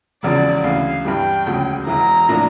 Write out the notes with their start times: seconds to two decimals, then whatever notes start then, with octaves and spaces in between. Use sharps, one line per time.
0.23 E1 E2 C#3 F3 D5
0.63 D2 C#3 E3 F5
1.05 G2 E3 G3 G5
1.47 E1 D2 C#3 F3
1.87 E1 E2 E3 A#5
2.29 A2 F3 A#3 D4